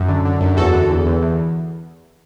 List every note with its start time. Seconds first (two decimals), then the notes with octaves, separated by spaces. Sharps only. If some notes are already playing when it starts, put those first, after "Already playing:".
Already playing: F#2
0.08 D3
0.25 D3
0.41 F#2
0.57 E2 F#4 A4
0.73 D3
0.90 E2
1.06 E2
1.22 E2